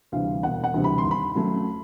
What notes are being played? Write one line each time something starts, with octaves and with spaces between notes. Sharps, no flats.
D2 C3 E3 G3 F5
E1 F#5
F#5
D2 C3 E3 G3
B5
C6
D#2
B5
C#3 F#3 A3 C#4